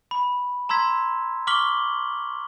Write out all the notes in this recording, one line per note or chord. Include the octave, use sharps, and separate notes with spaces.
B5
A#5 C6 E6 G#6 B6
C#6 D6 F6 B6 F#7 G7